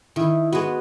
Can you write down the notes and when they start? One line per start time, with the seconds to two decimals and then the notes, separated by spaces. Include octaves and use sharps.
0.16 D#3 E4
0.52 G#3 B3 F#4